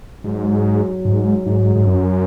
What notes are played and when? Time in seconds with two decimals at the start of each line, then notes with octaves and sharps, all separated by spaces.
0.23 G#2 F#3
1.05 G#2
1.46 G#2
1.75 G#2
1.87 F#2